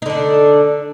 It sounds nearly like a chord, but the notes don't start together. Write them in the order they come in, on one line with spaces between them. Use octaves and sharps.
D#4 D3 D4